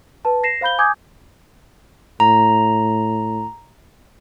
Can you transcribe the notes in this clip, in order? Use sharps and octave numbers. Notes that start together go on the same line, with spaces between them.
B4 A5
A#6 C7 E7
C5 F5 B5 G6 G7
G#5 D6 D#6 G6 G#6
A2 A#5